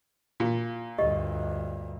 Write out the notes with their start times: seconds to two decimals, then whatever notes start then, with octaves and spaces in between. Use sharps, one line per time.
0.40 A#2
0.99 D2 G2 G4 D#5